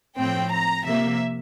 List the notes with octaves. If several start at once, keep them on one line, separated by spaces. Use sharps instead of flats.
A2 F3 C4 G5
A#5
C3 F3 A#3 E5